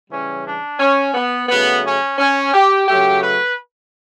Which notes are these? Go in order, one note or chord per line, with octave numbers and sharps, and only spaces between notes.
C#3 E3 G3 C#4
D4
C#4
B3
C#3 F#3 A3 B3
C#4
C#4
G4
C#3 F#3 A3 G4
B4